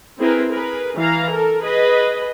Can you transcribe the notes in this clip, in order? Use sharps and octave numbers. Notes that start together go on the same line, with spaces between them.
C4 E4 G#4 A#4 B4
G#4 A#4 B4
E3 F5 A#5
A4 A#4
G#4 B4 D#5